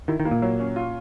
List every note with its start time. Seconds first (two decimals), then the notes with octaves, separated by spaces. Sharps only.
0.08 D#3 E4
0.20 D#3
0.25 A#3
0.31 A#2
0.42 F#3
0.60 C#4
0.76 F4